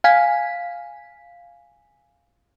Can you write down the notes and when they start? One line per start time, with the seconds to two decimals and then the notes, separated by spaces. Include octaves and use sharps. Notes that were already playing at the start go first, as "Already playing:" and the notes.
0.04 F5 G#5 B6